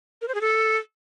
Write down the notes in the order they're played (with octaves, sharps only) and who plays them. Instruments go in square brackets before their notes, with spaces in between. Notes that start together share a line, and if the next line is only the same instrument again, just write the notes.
[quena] A#4
C5
G#4
A4